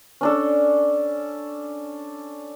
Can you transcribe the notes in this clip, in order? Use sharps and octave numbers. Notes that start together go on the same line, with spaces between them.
C#4 D4 A4